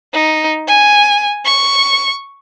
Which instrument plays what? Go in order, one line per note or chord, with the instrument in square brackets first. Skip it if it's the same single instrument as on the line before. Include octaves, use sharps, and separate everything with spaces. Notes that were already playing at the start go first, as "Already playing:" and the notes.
[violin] D#4
G#5
C#6